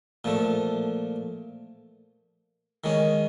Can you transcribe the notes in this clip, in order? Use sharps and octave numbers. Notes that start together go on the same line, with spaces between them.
A#2 F3 A3
D#3 G#3 C#4